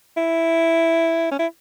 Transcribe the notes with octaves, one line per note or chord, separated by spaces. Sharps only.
E4
C#4
E4